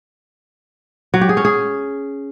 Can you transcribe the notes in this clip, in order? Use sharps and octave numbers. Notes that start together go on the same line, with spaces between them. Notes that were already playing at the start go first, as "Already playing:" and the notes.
F#3
G4
G#4
C#4
G#4